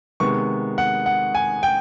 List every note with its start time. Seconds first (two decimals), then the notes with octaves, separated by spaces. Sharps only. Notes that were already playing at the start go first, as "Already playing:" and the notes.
0.20 C3 D#3 G#3 B3 C#6
0.78 F#5
1.06 F#5
1.35 G#5
1.63 G5